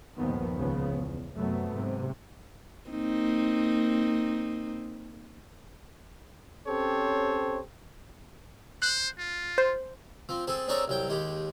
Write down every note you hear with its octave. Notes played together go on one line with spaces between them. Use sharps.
G1 D#2 A#2 D#3 F3 B3
C#2 C#3 F3 B3
E2
F#2 C3 F#3 A3 B3
G#2 C3
A#3 C4 D#4
C4 C#4 G4 A4 C5 C#5
C5 F#6
F4
C5
F3 C4
C4 G#4 A4
C4 D4 G#4 A4 C#5 A#5
C2 F#3 G5
D#2 G#3 G4